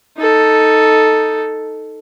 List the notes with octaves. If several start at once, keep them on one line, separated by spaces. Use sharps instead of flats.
D#4 A4